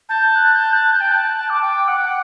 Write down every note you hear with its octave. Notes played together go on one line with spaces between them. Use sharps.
A5 G6
F#6
G6
F#6
G6
G5
A5 F#6
A5
A5 D6
G5
F#5 F#6
G5
F#5